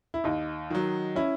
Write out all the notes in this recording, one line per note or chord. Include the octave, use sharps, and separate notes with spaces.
E4
D#2 D#4
D#3 F#3
C#4 E4